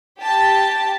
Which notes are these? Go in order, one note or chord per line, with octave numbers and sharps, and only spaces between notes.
G4 A5